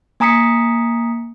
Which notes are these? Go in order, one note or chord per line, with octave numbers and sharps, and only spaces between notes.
A#3 G#5 A#5 D#6 B6 C#7